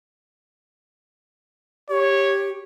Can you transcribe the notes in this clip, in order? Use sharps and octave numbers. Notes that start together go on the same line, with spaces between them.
G4 C#5